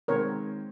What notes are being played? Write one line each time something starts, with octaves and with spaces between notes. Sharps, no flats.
D#3 G#3 C4 A#4 C#5